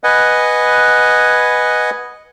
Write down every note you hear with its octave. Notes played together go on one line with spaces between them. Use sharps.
B4 D#5 F#5 G#5